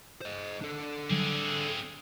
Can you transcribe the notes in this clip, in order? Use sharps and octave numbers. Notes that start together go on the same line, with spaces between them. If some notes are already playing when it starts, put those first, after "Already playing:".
C5 D#5
D4 A4
D3 F#3 G3 C4 G#4